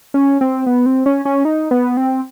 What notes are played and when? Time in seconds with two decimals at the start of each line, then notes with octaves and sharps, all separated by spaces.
0.14 C#4
0.41 C4
0.66 B3
0.86 C4
1.06 C#4
1.25 C#4
1.45 D#4
1.71 B3
1.97 C4